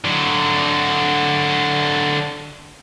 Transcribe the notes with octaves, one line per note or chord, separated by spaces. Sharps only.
D3 F#3